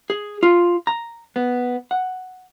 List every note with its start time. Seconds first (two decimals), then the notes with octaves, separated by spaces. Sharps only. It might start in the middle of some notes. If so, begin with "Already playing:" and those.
0.10 G#4
0.43 F4
0.87 A#5
1.36 B3
1.91 F#5